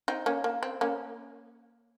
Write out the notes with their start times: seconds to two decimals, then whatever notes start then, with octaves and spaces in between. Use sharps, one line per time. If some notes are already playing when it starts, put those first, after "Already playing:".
0.08 C4 D#4
0.26 A#3 C#4
0.44 A#3
0.63 C4
0.81 A#3 C#4